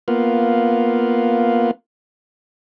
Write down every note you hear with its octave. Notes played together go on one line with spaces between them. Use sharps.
A#3 B3 F4